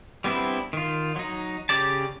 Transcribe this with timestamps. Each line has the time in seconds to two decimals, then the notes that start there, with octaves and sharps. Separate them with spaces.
0.24 G3 B3 C4 D4 E4
0.73 D#3 F4
1.16 F#3 D#4
1.69 C#3 C#4 G4 D5 A5